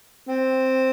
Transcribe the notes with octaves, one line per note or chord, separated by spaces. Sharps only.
C4